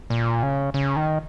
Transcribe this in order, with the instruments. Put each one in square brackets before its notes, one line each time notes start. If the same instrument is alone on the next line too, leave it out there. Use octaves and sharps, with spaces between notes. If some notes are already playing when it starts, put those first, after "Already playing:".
[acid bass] A#2
C#3
C#3
D#3